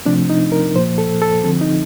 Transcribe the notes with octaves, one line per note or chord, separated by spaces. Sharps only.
C3 F3 A3 C4 D4
D#4
A#4
A#2 F3 A#3 C5
A4
A4
D3 F3 C4 A4
D#4